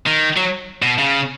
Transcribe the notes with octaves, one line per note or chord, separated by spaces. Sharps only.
D#3
F#3
B2
C#3